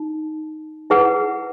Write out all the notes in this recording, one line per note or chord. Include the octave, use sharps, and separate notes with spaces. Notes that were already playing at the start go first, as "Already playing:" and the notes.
Already playing: D#4
E4 G#4 B4 F#5